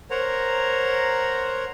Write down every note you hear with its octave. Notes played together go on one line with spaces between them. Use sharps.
A#4 C5 C#5 F#5 A#5